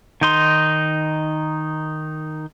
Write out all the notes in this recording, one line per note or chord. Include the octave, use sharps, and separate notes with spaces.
D#3 D#4 C6